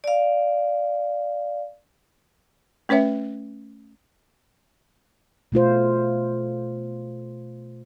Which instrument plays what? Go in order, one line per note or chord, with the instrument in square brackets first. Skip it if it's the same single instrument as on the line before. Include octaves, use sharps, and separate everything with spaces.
[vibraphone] D5 F5
[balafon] A3 C#4 B4 C#5 E5
[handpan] B2 A3 F4 C5